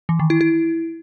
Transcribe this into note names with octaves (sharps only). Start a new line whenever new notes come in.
E3
D#3
E4
E4